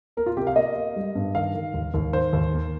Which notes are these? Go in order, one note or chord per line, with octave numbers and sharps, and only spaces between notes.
A#3 A#4
F4
C3 G4
F5
A#3 D#5
A#3
G3
G2
D#3 F5
D#3
D#2
D#2
D#3 C5
D#2
A#3